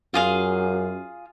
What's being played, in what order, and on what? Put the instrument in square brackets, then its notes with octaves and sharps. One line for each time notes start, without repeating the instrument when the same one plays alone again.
[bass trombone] F#2 [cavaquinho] F4 G#4 F5